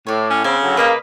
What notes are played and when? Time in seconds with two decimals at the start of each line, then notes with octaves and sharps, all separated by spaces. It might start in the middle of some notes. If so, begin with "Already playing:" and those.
0.07 A2 C#5 D5
0.30 C#4
0.44 C#3 B3 C4 G#5
0.62 D3 F#3
0.77 A#3 B4 D#5 F5